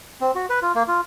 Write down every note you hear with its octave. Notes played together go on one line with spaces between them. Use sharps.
C4
F#4
B4
F4
A#3
F4